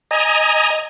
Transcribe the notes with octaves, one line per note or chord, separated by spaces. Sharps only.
D#5 G#5 A#5